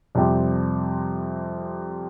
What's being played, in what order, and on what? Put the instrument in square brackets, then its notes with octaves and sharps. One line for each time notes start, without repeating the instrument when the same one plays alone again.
[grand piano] F2 C3 G3 C4 G4